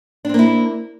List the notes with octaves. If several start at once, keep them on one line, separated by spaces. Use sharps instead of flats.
A#3 C4 D4 E4